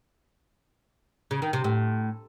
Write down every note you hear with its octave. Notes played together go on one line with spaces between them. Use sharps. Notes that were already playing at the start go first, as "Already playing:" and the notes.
C#3
D#3
C3
A2